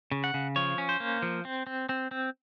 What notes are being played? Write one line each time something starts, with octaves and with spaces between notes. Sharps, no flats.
C#3
F#5
C#3
F3 C#5
C#4
C5
A#3
F3
C4
C4
C4
C4